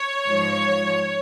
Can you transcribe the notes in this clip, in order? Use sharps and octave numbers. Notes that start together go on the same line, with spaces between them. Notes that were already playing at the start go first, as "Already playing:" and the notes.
Already playing: C#5
G#2 F3